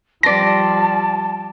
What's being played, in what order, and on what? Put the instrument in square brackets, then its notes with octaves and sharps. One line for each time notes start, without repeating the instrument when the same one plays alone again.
[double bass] F3 G3 [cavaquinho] D5 C6 [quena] A5 [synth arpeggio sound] A#6